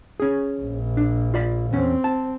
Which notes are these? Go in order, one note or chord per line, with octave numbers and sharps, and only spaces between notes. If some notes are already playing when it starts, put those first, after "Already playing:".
C#4 G#4
A#1
D4
F4 D5 B5
E2 C4 C#4
A5